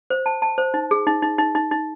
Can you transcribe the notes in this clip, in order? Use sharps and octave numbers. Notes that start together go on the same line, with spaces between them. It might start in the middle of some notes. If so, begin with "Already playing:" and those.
C5
A5
A5
C5
D#4
G#4
D#4
D#4
D#4
D#4
D#4